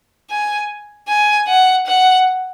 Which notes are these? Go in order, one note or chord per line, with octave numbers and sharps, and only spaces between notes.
G#5
G#5
F#5
F#5